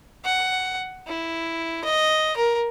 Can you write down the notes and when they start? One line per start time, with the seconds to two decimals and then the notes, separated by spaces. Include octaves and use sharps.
0.25 F#5
1.08 E4
1.84 D#5
2.36 A#4